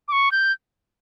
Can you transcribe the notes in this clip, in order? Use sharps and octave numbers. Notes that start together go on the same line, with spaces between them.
D6
C#6
G6